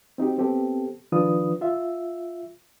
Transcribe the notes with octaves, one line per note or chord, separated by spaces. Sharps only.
C4 D#4 F#4 G4
B3 C4 G4 A4
D#3 F3 D4 F4 B4 D#6
F4 E5